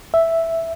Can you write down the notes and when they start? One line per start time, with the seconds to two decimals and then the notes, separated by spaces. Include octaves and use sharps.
0.14 E5